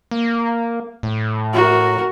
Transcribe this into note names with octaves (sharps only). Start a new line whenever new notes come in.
A#3
A2
F#4 A#4